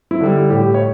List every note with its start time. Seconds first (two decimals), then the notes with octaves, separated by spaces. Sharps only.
0.11 E4
0.20 D3 G3
0.50 A2 G4
0.74 C#5